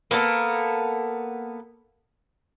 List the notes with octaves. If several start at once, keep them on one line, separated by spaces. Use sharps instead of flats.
A#3 B3 A4 A#4